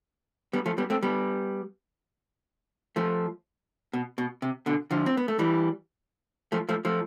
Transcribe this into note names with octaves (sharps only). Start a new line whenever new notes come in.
G3 B3
F3 A3
G3 B3
A3 C4
G3 B3
F3 A3
B2
B2
C3
B2 D3
D3 F3
C4
B3
A3
E3 G3
F3 A3
F3 A3
F3 A3